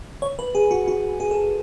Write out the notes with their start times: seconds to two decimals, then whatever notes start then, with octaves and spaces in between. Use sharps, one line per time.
0.22 C#5
0.39 B4
0.55 G#4
0.71 F#4
0.88 F#4
1.20 G#4
1.31 A4